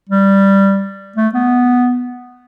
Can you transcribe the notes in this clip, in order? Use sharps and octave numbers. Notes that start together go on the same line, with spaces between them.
G3
A3
B3